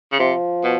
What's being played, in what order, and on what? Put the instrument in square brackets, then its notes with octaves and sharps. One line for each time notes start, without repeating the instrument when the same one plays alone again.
[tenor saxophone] C#3
[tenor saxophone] C3 [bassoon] F3
[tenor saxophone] B2